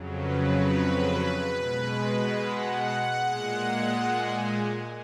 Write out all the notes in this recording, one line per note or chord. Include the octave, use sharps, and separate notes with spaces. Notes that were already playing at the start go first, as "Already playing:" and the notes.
Already playing: F2 C#3 F#3
B4
B4
B2 G#3
F#5
A#2 G#3
G#5